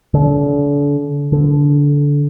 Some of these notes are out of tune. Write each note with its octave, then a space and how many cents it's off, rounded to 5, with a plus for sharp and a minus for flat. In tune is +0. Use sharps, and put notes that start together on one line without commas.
D3 -35
D3 -20